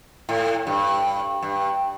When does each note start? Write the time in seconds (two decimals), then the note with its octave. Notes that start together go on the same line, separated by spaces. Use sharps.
0.29 A2
0.67 G2
1.42 G2